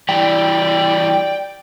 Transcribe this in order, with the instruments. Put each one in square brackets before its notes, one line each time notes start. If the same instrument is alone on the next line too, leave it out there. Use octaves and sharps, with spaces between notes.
[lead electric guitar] E3 G3 [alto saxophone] D5 [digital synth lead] G5